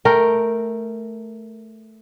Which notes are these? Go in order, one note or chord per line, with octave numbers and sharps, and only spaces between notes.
A3 A#4 G5